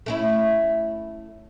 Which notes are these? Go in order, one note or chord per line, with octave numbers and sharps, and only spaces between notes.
A3 C#4 E4